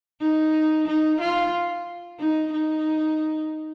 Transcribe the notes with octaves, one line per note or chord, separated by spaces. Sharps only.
D#4
D#4
F4
D#4
D#4